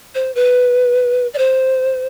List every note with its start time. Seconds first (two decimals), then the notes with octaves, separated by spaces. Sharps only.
0.15 C5
0.35 B4
1.34 D5
1.38 C5